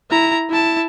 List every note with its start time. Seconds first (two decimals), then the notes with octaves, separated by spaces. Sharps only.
0.11 E4 A#5
0.49 E4 A5